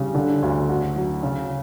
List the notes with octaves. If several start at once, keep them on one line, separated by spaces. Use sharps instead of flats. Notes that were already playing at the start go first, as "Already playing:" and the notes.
Already playing: C#3 G3
D3
D2
F#4
F#3
C#3